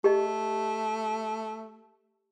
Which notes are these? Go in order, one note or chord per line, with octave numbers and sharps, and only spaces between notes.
A3 G4 D#5